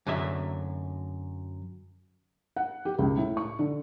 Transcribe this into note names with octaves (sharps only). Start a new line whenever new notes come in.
F#2 D3 F#3 E5
F#5
G4
C#2
A2
C#6
D3